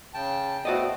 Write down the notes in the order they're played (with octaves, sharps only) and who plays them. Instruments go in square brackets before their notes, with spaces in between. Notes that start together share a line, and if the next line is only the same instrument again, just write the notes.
[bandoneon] C#3 G5 A5
[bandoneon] A3 B3 C4 [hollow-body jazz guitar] F#4 D5 D#5